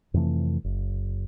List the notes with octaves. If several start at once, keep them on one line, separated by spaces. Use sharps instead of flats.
F2 C3 E3 A3
F#1